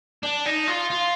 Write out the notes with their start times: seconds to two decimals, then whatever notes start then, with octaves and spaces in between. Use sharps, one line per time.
0.23 D4
0.46 D#4
0.67 F4
0.90 F4